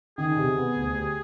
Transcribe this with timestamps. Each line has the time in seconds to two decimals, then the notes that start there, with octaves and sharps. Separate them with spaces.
0.18 D#3 G#4
0.37 C3
0.56 B3
0.75 D2
0.95 G4